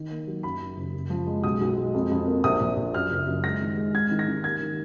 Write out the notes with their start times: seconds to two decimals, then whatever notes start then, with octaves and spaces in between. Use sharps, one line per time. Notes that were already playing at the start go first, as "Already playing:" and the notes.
Already playing: D#3
0.11 A#3
0.27 F#3
0.43 F#2 B5
0.61 F#2
0.77 F#1
0.94 F#2
1.10 F3
1.27 G#3
1.44 B1 D#6
1.61 B1
1.77 G#3
1.94 F2
2.11 F2
2.27 A#3
2.44 A#1 D#6
2.61 A#1
2.77 A#1
2.94 F#2 F6
3.11 F#1
3.28 F#2
3.44 G#3 A#6
3.62 D#3
3.77 G#3
3.94 G#2 G#6
4.11 D#3
4.19 A#6
4.28 D#3
4.44 A#3 G#6
4.60 D#3